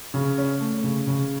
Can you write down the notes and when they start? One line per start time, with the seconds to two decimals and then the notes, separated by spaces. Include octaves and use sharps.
0.14 C#3
0.38 C#4
0.60 A3
0.84 C#3
1.07 C#3